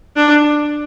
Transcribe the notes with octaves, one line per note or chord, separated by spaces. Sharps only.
D4